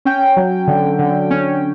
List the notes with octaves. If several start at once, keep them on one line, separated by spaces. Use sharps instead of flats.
C#4 G5
F#3
D3
D3
C#4